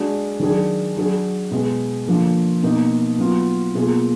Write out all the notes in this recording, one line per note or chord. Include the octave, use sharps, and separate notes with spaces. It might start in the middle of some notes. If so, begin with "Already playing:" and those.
Already playing: G#3 D4 F#4
D#3 F#3 D4 G#4
F#3 D4 G#4
B2 G#3 B3
D3 F3 A#3
B2 A#3 D#4
F#3 B3 F4
B2 A#3 F4 G#4